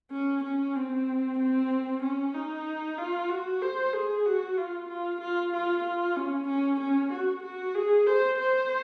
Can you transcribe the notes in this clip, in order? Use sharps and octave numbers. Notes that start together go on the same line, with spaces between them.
C#4
C#4
C4
C4
C#4
D#4
F4
F#4
C5
G#4
F#4
F4
F4
F4
F4
F4
C#4
C#4
C#4
F#4
F#4
G#4
C5
C5